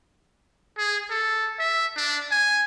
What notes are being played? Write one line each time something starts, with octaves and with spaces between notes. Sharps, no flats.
G#4
A4
E5
D4
G#5